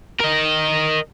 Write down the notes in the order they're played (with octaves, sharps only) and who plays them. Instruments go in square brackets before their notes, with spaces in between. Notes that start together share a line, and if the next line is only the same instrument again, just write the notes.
[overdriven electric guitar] A#4 D#5